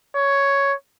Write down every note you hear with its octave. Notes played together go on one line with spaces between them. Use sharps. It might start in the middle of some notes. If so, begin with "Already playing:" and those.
C#5